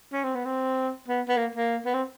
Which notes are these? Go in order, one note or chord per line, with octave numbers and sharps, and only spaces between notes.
C#4
C4
B3
C4
B3
B3
A#3
A#3
B3
C4